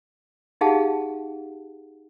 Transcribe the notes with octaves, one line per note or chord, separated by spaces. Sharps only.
D#4 G4 G#4 F5 F#5 A5